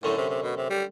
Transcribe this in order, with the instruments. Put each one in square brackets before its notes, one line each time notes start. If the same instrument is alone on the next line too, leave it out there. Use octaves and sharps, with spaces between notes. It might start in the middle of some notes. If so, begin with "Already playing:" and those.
[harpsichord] F#2 D3 A3 [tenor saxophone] A2
[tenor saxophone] C3
C3
B2
C3
G3